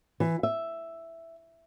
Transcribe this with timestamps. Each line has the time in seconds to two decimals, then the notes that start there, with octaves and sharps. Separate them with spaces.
0.20 E3
0.43 E5